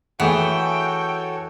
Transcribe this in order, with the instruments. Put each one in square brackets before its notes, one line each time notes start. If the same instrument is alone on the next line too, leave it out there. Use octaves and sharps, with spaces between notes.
[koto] E3 [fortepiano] A3 G#4 F#5 [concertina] F#4 A4 C#5 [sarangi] G5